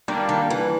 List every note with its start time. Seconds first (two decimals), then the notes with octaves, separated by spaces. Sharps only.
0.08 D#3 G3 A#3 D4
0.29 D#3
0.50 E3